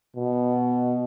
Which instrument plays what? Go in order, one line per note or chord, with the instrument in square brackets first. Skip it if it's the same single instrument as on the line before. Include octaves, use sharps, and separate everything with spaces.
[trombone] B2